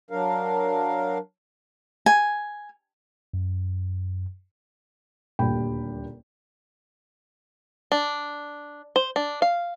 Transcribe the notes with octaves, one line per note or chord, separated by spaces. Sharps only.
F#3 D4 A#4 F5
G#5
F#2
D#1 D2 A#2 G3 G5 B5
D4
C5
D4
F5